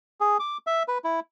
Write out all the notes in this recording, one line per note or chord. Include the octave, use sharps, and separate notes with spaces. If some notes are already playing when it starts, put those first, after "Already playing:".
G#4
D6
E5
B4
E4